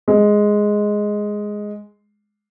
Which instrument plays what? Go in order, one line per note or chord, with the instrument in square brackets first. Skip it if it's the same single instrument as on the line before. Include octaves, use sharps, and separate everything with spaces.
[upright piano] G#3